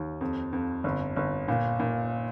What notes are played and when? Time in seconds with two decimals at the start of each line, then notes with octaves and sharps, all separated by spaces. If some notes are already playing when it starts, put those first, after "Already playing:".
Already playing: D#2
0.21 F2
0.53 F2
0.84 G1
1.16 G1
1.48 A#2
1.79 A#2